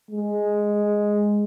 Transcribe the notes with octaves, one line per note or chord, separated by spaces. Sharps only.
G#3